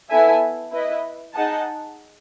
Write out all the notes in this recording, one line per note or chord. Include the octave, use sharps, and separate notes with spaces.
B3 E4 A4 E5 G#5
E4 B4 D#5
D#4 G#4 D#5 F#5 A5